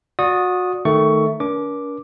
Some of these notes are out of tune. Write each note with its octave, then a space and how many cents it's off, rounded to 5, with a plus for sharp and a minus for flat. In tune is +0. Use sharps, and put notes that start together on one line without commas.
F#4 -30 D5 -10 D#6 +0
D#3 +0 A3 +0 C#6 +15
D4 -45 A#4 +40 D6 +0